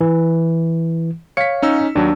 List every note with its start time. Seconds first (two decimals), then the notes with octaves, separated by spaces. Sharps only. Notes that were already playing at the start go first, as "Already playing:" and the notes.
0.01 E3
1.37 C#5 F5 B6 C#7
1.62 C#4 D#4 E6
1.95 D#2 F#3 D4